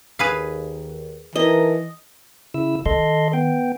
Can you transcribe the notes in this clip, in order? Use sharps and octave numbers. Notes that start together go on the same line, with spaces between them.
D#2 G#4 B4 F5
E3 D#4 A4 A#4 D#5
C#3 E4 E6
D#3 A4 D#5 C6
B3 G5